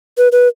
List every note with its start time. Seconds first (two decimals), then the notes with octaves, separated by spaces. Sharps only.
0.18 B4
0.32 B4